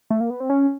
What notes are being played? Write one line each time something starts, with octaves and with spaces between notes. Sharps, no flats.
A3
A#3
B3
C4
C#4